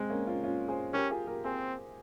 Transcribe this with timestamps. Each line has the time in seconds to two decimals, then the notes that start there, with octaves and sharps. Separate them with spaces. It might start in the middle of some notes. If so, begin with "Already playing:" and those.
Already playing: G#3 C4
0.10 A#3 C#4
0.27 C#4 F4
0.44 C#4 F4
0.68 G#4 C5
0.93 C#4 G4 A#4
1.10 F4 G#4
1.27 G4 A#4
1.44 C4 G#4 C5